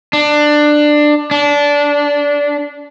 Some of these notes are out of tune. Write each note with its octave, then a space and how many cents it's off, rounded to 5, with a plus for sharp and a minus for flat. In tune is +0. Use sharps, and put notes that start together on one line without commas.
D4 +15
D4 -20